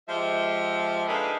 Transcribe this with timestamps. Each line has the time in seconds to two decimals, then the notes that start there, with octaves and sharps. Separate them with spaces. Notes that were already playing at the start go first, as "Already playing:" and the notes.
0.08 F3 G#3 G4 C5 E5
1.08 A#3 D4 D#4 G#4 A4 B4